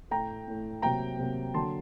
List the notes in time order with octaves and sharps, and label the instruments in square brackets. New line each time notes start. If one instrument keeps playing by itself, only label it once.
[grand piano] A2 A3 G5 A#5
A2 A3
C3 F#3 A#3 G5 A#5
C3 F#3 A#3
D3 F#3 A#3 A5 C6